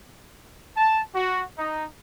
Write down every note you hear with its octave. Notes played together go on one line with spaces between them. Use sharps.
A5
F#4
D#4